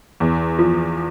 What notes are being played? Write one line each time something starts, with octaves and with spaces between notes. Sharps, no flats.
E2
F3